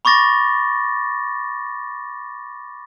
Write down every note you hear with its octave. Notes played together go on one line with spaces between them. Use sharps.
B5 C#6 D6 A6 A#6